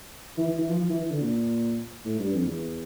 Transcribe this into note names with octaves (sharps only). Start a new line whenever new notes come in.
E3
E3
E3
F3
F3
E3
E3
D3
A#2
A2
G2
F2
E2